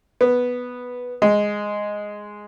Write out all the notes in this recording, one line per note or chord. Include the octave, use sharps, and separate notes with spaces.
B3
G#3